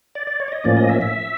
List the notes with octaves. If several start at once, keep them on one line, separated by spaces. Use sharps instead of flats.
D5
D5
C#5
D5
D#5
A2 F3 A#3 C#4 D5
D#5
E5
E5